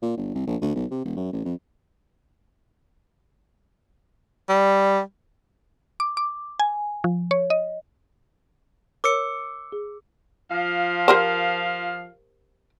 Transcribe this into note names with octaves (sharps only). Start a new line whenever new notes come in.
A#2
G1
C2
A#1
D2
B1
C3
E1
F#2
A1
F2
G3
D6
D6
G#5
F3
C#5
D#5
A#4 C#5 D6 E6 C#7
G#4
F3 F5
G4 A#4 C5